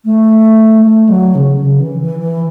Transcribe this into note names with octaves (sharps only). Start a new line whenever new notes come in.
A3
A3
F#3
C#3
C#3
E3
E3
E3